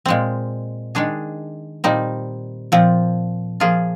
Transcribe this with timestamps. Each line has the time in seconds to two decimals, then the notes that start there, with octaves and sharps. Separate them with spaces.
0.06 A#2 G#3 C4
0.95 D#3 G#3 D4 G#4
1.84 A#2 G3 C4 D#4
2.72 A#2 F3 C4
3.60 F3 A#3 F4 G#4